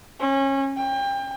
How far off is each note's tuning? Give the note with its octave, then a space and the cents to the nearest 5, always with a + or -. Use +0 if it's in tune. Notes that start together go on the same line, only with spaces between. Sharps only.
C#4 -25
G5 +30